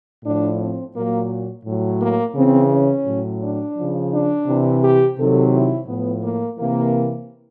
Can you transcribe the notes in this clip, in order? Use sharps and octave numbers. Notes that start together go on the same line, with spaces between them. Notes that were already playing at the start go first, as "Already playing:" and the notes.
A2 F3 D4
C4
A#2 F#3 A#3
A2 F#3
A#3
C#3 E3 C4
C#4
A2 F#3
D4
C#3 F3
D4
C3 E3
G4
C3 D#3 F#3 A4
E4
A2 F3 B3
A#3
C3 E3 A#3